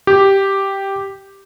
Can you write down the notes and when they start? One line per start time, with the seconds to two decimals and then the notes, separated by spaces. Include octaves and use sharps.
0.07 G4